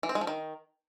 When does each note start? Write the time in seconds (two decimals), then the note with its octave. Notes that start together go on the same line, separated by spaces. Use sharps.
0.03 E3
0.09 C4
0.15 G#3
0.21 F3
0.27 D#3